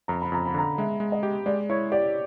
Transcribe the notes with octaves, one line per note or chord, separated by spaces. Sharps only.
F2 A#5
B5
F2 A#5
B5
D3 A#5
G#3 E5
G#3
D#5
G4
G#3 D5
E4 C#5
G4 D5